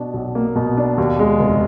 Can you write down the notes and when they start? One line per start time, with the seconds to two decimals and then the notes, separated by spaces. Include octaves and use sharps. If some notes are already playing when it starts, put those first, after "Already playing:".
Already playing: B2 D4
0.14 B1
0.35 A#3
0.56 B2
0.77 D4
0.98 D#2
1.19 G#3
1.40 F1